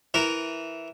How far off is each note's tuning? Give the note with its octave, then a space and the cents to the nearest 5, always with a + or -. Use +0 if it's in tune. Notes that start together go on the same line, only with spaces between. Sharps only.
E3 +0 A#4 +0